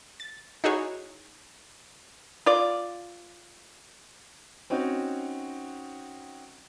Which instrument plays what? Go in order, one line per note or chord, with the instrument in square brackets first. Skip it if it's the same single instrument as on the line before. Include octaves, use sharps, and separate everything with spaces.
[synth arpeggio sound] A6
D#4 E4 F#4 G#4 C#5
[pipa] F4 D5
[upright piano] C4 C#4 D#4 F#4